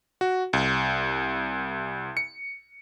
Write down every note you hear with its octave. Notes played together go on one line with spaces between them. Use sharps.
F#4
C2
C#7